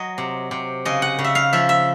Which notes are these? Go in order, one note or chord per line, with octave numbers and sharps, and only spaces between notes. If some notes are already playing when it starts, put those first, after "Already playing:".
Already playing: F#3 D#5
C3
C3
C#3 D#5
F#5
C#3
E5
F5
F3 E5
E5